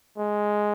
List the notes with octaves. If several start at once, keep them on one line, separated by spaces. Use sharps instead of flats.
G#3